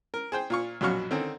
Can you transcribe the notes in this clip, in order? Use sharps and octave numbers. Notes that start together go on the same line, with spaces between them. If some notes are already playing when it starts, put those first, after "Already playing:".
A#4
G#4 C5 G5
A#2 F4 C#6
A#1 F#2 B2 F#3 F5 C#6
D3 D#3 C4 C#4